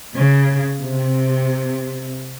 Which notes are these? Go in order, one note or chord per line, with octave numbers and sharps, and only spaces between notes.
C#3
C3